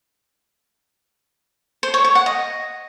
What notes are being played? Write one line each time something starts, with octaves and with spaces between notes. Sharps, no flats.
C5
C#5
C#5
F#5
D#5